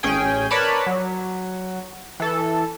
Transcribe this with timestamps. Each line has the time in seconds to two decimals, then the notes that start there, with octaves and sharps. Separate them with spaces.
0.03 A1 C#4 G#4 G5 G#5
0.50 A#4 B4 C#5 D5 A5 B5
0.86 F#3
2.20 E3 A4